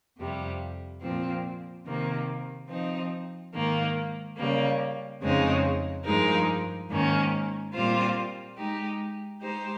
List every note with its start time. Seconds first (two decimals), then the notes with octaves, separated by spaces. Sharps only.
0.17 F2 C3 G3
1.02 A#2 F3 C4
1.86 C3 D#3 A#3
2.69 F3 C4 D#4
3.54 G#2 D#3 A#3
4.37 C#3 G3 A#3
5.21 F2 C#3 G#3 C4 D#4
6.05 G2 F3 G#3 D#4 A#4
6.89 G#2 D#3 A#3 C#4
7.74 A#2 G3 C4 F4 C5
8.57 G#3 D#4 G4
9.41 G#3 D#4 G4 C5